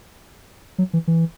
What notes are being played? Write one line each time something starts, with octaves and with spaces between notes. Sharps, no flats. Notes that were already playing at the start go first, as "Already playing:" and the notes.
F#3
E3
E3